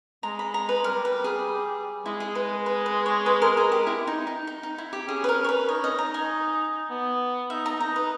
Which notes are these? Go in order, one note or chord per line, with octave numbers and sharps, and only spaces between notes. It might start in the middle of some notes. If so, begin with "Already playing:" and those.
G#3 A#5
B5
A#5
B4
G3 A#4
B4
G#4
G#3 E4
G#4
G#3 B4
B4
B4
C#5
B4
A#4
G#4
G4
E4
D#4
D#4
D#4
D#4
E4
G4
C#4 G#4
B4
A#4
C#5
B4
D#4 C#5
C#4 D#5
D#4
A#5
G#5
B3
D#4 E5
A#5
D#4 A#5
B4